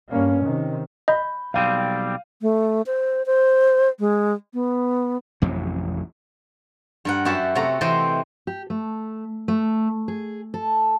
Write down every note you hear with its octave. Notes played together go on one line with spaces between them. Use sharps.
G2 A#3 C#4
C3 D#3
D#5 B5 G6
B1 G3 C4 F5 D#7
A3
C5
C5
G#3
B3
A1 F2 C3 F#3
G2 A#4 F#5
F#2 F#4 G4 E5 A5
C3 A3 F#4 A#5
C3 E3 C4 C5 D#5 G5
G4
A3
A3
G#4
A4